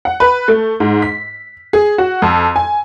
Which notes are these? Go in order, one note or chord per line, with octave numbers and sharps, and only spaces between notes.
F#5
B4
A3
G#2
B6
G#4
F#4
F2
G#5